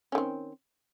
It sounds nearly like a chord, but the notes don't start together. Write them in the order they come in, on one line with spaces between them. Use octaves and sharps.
C#4 D#3 C4